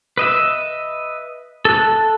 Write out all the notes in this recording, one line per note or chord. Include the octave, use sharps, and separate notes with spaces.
B4 D#5 E5
A4 F#6